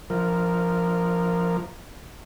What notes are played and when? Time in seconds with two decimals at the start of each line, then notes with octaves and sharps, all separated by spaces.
0.10 F3 A#4